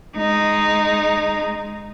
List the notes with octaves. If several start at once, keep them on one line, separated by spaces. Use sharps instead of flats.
G#3 D#4